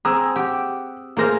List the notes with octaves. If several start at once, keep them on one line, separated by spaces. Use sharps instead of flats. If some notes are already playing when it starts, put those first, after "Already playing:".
C4 G#4 A#5 D#6 E6
G4 F#5
A3 A#3 G#4 C5 F5 A#6